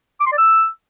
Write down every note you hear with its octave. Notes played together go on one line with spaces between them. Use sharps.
D6
C6
D5
E6